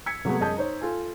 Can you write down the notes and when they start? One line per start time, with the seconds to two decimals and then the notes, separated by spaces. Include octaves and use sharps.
0.06 E6 G#6 B6 C#7
0.25 C3 F#3 G#3 A3 B3
0.40 F#2 G#3 D#5 A5 G6
0.57 D#4 C5 C#5
0.81 F4 A4 G#5